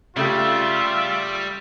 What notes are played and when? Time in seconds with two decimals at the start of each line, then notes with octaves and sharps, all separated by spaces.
0.16 C#3 G3 A3 F4 G4 E5